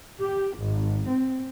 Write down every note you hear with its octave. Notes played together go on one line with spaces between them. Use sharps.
G4
G#1
C4